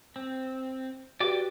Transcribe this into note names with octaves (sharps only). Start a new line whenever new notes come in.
C4
F#4 G4 B4 D5 G5 D6